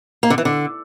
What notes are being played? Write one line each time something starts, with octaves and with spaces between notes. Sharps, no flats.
A#3
D3
E3
D3